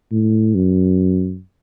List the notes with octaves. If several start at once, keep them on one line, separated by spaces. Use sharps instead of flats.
A2
F#2